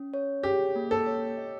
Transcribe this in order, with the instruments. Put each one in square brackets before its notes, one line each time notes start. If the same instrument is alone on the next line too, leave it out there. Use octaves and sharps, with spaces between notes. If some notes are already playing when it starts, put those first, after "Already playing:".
Already playing: [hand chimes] C#4
C#5
[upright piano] G4 [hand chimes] G#4
[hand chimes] A#3
[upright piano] A4
[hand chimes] C#5
D#5